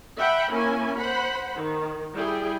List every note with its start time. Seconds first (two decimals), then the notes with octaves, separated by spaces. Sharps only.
0.17 E5 F#5 G5 B5
0.51 A#3 C#4 E4 G#5
0.97 C5 F#5 B5
1.56 D#3
2.15 G3 E4 G#4 G5